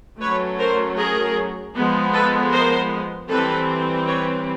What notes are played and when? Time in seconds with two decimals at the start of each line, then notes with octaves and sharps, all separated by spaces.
0.20 F#3 A3 C#4 B4 C#5
0.59 A#4 C5
0.97 G#4 A#4
1.75 F3 G#3 B3
2.14 A4 B4
2.52 A#4 C5
3.29 E3 G3 C4 A4 B4
4.07 B4 C#5